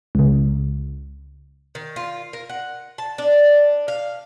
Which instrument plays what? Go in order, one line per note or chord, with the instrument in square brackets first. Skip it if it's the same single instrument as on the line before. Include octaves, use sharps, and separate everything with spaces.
[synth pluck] C#2 C#3
[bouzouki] D#3
F4
A#4
F#5
A5
D4
F5